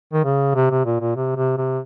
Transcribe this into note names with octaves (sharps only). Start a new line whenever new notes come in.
D#3
C#3
C3
C3
A#2
A#2
C3
C3
C3